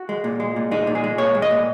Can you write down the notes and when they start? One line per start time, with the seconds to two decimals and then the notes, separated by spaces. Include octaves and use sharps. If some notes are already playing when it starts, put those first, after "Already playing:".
Already playing: F#4
0.09 G#3
0.24 A#2
0.40 G#3
0.56 A#2
0.71 G#3 D#4
0.87 A#2
0.95 G#4
1.04 G#3
1.18 A#2 C#5
1.35 G#3
1.42 D#5
1.51 A#2